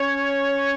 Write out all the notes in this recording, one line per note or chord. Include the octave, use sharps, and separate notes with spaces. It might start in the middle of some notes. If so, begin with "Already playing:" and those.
Already playing: C#4 C#5